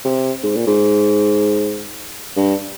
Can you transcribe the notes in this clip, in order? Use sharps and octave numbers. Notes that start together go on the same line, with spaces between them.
C3
G#2
A#2
G#2
G2